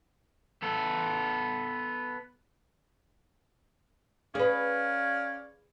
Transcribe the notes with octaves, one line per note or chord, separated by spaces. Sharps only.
B3 A4
C#4 G#4 B4 D5 F5